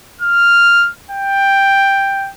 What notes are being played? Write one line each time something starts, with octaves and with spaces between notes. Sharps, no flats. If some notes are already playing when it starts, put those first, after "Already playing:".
F6
G5